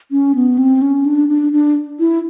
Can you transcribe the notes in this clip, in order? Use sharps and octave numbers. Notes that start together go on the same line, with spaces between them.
C#4
B3
C4
C#4
D4
D4
D4
E4